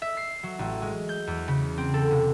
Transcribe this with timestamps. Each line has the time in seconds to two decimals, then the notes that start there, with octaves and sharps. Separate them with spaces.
0.02 E5
0.17 C7
0.43 F#3
0.59 A1
0.82 G#3
1.09 G6
1.27 E2
1.48 C#3
1.78 C4
1.94 A4
2.11 C3